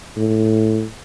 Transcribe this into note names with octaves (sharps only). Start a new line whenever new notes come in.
A2